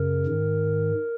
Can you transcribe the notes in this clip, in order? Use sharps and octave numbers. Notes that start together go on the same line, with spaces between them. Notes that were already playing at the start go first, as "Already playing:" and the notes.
Already playing: F#2 C#3 A#4
G#2 D#3